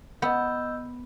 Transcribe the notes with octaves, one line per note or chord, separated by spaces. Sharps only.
B3 D#5 E6 G6